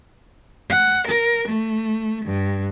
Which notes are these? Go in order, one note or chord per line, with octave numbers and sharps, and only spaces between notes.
F#5
A#4
A3
G2